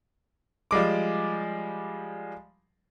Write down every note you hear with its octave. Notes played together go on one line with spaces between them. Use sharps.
F3 G3 G#3 D6